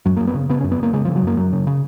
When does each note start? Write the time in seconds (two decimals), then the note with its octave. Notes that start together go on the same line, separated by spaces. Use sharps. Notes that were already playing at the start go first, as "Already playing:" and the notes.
0.06 F#2 F#3
0.17 A#3
0.20 F#2
0.27 B3
0.35 C#3
0.49 C#3 B3
0.61 C#4
0.64 F#2
0.72 B3
0.79 F#2 A#3
0.93 C#3 G#3
1.05 F3
1.08 C#3
1.16 F#3
1.23 F#2 A#3
1.37 F#2 F#3
1.53 C#3
1.67 C#3